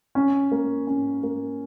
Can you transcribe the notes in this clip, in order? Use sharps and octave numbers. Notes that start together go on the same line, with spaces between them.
C#4
A#3
C#4
A#3